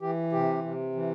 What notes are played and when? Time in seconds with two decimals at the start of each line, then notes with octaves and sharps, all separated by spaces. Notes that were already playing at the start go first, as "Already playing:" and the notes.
0.01 E3 G4
0.32 C3 G4
0.64 C3
0.95 E3